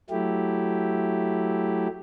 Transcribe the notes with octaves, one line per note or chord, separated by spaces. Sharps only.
F#3 A3 E4 G4